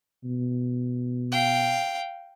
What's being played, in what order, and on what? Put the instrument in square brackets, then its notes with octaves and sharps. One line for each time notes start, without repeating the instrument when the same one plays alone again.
[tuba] B2
[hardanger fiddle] F5 G5